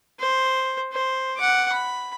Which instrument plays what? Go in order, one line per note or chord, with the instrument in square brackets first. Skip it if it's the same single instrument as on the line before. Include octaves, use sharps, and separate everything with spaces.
[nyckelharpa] C5
C5
F#5 D6
B5